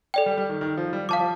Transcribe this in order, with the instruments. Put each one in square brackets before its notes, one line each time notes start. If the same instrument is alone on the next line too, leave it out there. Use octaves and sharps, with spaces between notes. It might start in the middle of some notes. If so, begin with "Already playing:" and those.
[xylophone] A4 D5 G5
[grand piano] G3
G3
D#3
D#3
F3
G3
[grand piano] F3 [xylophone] F5 A5 D6
[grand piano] F3